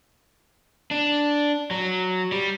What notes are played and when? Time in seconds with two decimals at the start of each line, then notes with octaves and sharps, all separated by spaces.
0.91 D4
1.71 F#3
2.32 G3